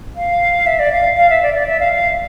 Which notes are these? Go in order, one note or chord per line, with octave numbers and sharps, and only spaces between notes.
F5
E5
D5
F5
F5
E5
D5
D5
E5
F5
F5